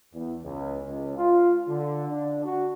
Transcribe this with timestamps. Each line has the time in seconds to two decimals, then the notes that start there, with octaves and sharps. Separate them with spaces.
0.13 E2
0.43 C#2
0.86 C#2
1.17 F4
1.68 D3
2.09 D4
2.45 F#4